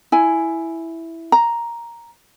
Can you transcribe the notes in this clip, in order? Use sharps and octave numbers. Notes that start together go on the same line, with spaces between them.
E4 G#5
A#5